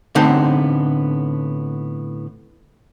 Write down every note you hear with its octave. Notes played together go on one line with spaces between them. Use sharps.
A2 D3 B3 C4 D#4